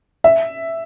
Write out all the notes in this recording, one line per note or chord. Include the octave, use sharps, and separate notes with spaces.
E5